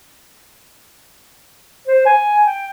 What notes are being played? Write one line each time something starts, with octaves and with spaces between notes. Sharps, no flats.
C5
G#5
G5